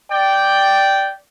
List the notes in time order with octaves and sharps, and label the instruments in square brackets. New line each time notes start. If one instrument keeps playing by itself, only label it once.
[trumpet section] D5 G5